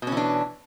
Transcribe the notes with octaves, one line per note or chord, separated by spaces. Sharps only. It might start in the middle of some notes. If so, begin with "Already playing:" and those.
B2 E3 C#4 D4